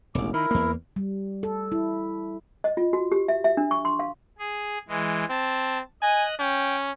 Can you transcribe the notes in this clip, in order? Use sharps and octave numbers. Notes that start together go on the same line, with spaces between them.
E1 A1 D6
D#3 E4 A#4
E2 A#3
G3
A4
E4
D#5
F4
F#4
G4
E5
E5
D4
C#6
C6
F5
G#4
E3 G#3
C4 A5
D#5 G#5 F#6
C#4 G5